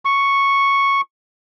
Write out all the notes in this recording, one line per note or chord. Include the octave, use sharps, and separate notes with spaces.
C#6